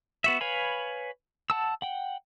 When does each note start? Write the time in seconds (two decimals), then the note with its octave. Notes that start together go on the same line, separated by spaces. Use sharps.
0.24 B3 F#4 E5
0.41 B4 C#5 F5 G#5 B5
1.50 F#5 A5 E6
1.82 F#5 G5